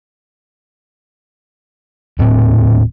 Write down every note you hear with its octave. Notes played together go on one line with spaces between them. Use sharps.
D#1 A2 C4